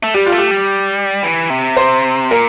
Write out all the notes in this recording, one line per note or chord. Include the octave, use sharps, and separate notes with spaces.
A3
G3 G4
F4
A3
G4
G3
E3
C3
C5
A#2 A#4